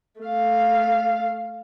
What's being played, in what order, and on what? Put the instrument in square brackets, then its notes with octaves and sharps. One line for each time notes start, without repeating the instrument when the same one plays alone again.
[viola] A3 F5